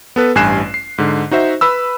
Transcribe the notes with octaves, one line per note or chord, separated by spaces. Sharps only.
B3 A4 B4
A1 G2 G#5 F#6 C7 E7
C7
G#2 D3
D#4 F#4 C5 E5
B4 B5 E6